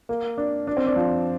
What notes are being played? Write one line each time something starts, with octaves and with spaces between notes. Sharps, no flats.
A#3
D4
D4
C4
D4
F3